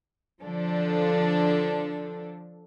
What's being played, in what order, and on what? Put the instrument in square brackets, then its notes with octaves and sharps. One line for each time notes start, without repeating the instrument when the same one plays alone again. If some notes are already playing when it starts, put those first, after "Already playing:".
[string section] D3 F3 D4 A4